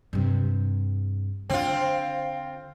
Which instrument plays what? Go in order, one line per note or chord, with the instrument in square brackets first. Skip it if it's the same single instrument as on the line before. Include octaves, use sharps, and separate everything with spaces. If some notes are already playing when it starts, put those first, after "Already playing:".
[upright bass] G2 C3
[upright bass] D3 [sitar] C4 F4